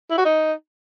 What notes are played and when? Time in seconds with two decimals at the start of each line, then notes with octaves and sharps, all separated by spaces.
0.10 E4
0.18 F#4
0.25 D#4